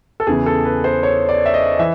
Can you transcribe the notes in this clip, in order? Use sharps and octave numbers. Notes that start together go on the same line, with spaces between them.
A4
E2 C#3 E3 G#4
A4
B4
C5
C#5
D5
E5
D#5
E3 E5